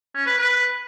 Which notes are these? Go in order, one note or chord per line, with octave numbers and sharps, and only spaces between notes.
C#4
B4
B4